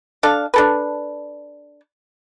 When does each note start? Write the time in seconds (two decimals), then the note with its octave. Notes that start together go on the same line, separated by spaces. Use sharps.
0.23 D4 A4 F5
0.54 D4 A4 B4